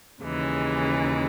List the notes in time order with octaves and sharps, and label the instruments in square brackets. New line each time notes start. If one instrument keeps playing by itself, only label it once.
[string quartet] D#2 C#3 E3 G#3